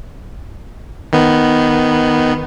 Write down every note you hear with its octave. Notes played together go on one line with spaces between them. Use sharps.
D#3 B3